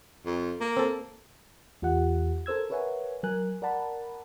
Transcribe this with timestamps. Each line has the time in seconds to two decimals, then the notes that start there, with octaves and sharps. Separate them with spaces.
0.25 F2
0.60 A#3
0.77 C4 A4
1.82 E2 F4 G4 F#5
2.46 A4 A#4 C5 E6 G#6
2.70 A#4 B4 C#5 E5 F#5 G#5
3.23 F#3 A#4 G#5 F#6
3.62 A#4 D5 F#5 A5 B5